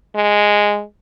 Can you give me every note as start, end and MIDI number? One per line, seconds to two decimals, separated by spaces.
0.16 0.82 56